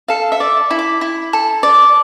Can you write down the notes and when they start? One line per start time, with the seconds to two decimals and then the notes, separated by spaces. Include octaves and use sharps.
0.08 A4 F5
0.32 E5
0.40 D5
0.71 E4
0.79 D6
1.01 E4
1.33 A4
1.63 D5